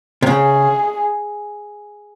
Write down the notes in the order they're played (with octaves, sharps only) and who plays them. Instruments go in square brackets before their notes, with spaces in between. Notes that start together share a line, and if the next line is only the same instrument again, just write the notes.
[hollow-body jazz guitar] C3
[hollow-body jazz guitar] C#3 [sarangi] G#4